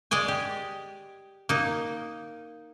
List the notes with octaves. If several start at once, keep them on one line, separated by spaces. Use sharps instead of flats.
G#3 D5 D#5 G#5
G4
A#3 D#4